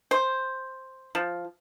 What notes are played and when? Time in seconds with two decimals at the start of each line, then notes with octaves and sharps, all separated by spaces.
0.11 C5
1.15 F3